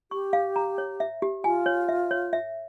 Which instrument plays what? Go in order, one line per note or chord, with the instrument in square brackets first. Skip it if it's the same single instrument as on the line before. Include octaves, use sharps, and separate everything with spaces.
[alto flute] G4 [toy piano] C#6
[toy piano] F5
A#5
C#5
E5
G4
[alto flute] F4 [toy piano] G#5
[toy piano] C#5
E5
C#5
E5